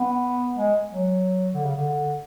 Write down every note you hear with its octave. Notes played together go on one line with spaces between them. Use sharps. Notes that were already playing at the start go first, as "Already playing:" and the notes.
Already playing: B3
G#3
F#3
D3
C#3
D3